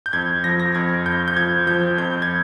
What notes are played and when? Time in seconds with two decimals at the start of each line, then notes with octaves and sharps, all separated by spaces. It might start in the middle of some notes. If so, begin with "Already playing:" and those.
0.06 G6
0.13 F2 G#6
0.44 F3 A#6
0.60 A#6
0.75 F2 G#6
1.06 F2 G6
1.28 G6
1.36 F3 G#6
1.67 F3 G6
1.98 F2 G6
2.22 G#6